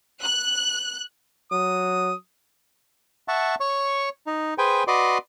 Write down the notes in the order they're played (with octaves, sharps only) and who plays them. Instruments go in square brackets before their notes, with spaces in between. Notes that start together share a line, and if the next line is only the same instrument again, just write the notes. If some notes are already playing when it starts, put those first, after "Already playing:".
[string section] F#6
[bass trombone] F#3 [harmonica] D#6
[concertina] E5 F#5 A5 C#6
C#5 C#6
D#4
G#4 B4 C5 G5 G#5
F#4 B4 D5 D#5 C6 D6